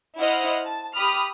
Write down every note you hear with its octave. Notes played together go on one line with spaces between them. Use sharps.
E4 C5 D#5 F#5 F6
A5
G4 B5 D#6 F6